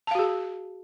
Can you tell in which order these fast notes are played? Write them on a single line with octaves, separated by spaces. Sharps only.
A5 F5 F#4 G#4